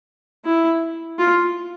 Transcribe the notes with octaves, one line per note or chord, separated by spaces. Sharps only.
E4
F4